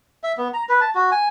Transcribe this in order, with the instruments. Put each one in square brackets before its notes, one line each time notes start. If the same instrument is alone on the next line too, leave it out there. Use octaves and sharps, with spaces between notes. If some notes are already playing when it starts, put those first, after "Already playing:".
[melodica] E5
B3
A#5
B4
A5
F#4
G#5